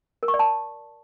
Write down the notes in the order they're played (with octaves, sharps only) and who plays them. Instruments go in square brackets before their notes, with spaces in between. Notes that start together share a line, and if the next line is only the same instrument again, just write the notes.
[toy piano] A#4
C#6
D5
A5